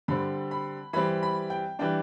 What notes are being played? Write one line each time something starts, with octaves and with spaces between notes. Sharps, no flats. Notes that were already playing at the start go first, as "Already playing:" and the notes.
D3 G3 C4 B5
B5
E3 G3 C4 B5
B5
G5
E3 G3 D4 G5